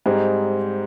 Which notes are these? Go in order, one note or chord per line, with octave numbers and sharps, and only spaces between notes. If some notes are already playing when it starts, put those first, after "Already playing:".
G#2 G3 C4 D#4 G#4